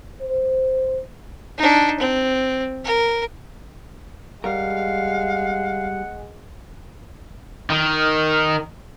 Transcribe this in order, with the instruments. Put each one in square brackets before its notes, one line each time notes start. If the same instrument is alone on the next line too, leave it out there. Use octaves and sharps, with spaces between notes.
[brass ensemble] C5
[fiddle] D4 D#4
C4
A#4
[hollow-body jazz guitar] G3 A#4 [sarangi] G#3 [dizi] F5 [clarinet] F#5
[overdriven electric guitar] D#3